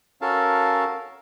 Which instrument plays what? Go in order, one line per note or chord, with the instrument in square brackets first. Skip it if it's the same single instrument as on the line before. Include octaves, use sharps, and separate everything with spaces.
[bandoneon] C#4 F#4 A4 A#4 F5 A5